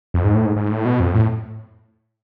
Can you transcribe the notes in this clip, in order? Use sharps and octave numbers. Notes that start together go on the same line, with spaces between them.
F2
G#2
A2
G#2
G#2
A2
B2
F2
A2